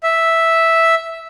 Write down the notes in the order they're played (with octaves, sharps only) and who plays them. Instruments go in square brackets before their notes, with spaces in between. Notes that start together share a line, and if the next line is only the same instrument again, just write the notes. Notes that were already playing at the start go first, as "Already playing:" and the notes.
[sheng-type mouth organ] E5